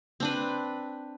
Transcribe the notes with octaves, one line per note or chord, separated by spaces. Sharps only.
C4 D4 B4